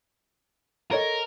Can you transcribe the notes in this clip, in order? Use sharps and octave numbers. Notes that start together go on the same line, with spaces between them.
A4 A#4 C#5 D#5